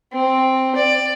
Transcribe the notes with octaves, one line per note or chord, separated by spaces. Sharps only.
C4
D5